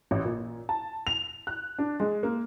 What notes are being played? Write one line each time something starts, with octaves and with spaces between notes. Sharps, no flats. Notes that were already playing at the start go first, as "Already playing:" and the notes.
A1
A#2
A5
F7
F#6
D4
G#3
A#3